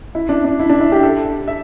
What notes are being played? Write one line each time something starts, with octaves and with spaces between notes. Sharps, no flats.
E4
D4
D4
E4
D4
E4
G4
A4
E5